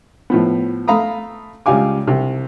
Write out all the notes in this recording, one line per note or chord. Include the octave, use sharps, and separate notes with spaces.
A2 F3 B3
A3 F5 A#5 B5 D#6
C#2 G3 F5 G#5 D6
C2 C3